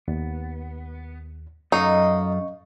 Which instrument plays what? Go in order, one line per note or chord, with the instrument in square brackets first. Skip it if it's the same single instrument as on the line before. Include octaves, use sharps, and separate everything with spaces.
[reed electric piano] D#2 [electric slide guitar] B3
[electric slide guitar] F#2 A4 F5 [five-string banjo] D#4 [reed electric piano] D#5 C#6